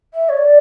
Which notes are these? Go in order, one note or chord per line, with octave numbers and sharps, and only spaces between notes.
E5
C#5
D5